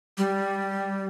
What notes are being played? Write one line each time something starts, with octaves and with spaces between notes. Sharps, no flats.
G3